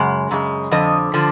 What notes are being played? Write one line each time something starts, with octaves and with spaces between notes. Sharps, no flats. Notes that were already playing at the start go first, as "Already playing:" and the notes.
Already playing: F#2 C#3 G#3
F#2 C#3 G#3
F2 D3 F3 D#5
D3 F3